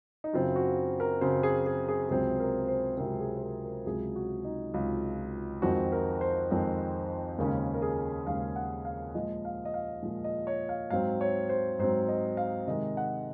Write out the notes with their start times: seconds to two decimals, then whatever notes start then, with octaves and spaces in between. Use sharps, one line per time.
0.24 D#4
0.33 F#2 C#3 F#3 C4 F4
0.56 F#4
1.00 A#4
1.21 F#2 C#3 F#3 C4 C5
1.43 G#4
1.66 G#4
1.88 G#4
2.10 C#2 C3 F#3 C4 G#4
2.40 A#4
2.68 C5
2.98 C#2 C3 F#3 C4 A#4
3.21 G#4
3.36 C5
3.42 A#4
3.64 A#4
3.86 C#2 C3 F#3 G#4
4.16 F#4
4.45 D#4
4.74 C#2 C3 F#3 F4
5.62 F2 D#3 G#3 C4 F#4
5.92 A#4
6.21 C5
6.50 F2 D#3 G#3 C4
7.38 D#2 C#3 G#3 C#4 A#4
7.74 A#4
7.82 G#4
8.27 D#2 C#3 G#3 C#4 F5
8.56 F#5
8.85 F5
9.15 A#2 F3 G#3 D#5
9.45 F5
9.65 D#5
9.74 F5
10.03 A#2 F3 G#3
10.24 D#5
10.47 C#5
10.69 F5
10.90 G#2 F#3 C4 F5
11.21 C#5
11.49 C5
11.79 G#2 F#3 C4 C5
12.09 D#5
12.37 F5
12.67 C3 D#3 G#3 D#5
12.97 F#5